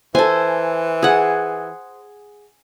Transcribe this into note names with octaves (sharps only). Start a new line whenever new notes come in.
E3 A4 C5 G#5
G#4 F#5